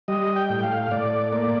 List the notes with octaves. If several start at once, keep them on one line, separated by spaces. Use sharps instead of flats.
G3 D#5
G5
A2
F5
A2 D5
A#3 D5